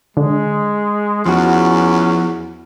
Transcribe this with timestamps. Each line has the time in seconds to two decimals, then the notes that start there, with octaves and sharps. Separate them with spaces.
0.17 D3 G#3
1.25 E2 F3 C#4 F#4